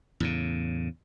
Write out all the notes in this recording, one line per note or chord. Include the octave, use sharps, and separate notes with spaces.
E2 A2 C#3